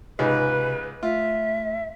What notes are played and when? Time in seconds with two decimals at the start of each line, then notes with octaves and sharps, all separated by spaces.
0.19 C#2 G#2 C3 B4
1.03 A3 F4 E5